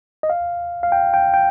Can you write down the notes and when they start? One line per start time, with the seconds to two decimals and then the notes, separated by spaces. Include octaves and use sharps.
0.23 D#5
0.30 F5
0.83 F5
0.92 G5
1.14 G5
1.34 G5